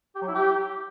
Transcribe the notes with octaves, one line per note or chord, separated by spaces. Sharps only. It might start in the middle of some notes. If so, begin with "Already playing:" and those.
G4
F#3
E4
G4